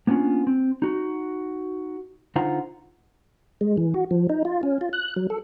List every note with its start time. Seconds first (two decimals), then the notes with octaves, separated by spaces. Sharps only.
0.07 A#3 B3 C#4 D4 F4
0.47 C4
0.82 D#4 F#4
2.36 D3 D#4 F4 C5 F#5 A#5
3.61 G#3
3.77 E3
3.94 F#4
4.11 F3
4.30 D#4
4.45 F4
4.63 C#4
4.81 F4
4.93 F#6
5.16 F#3
5.30 A4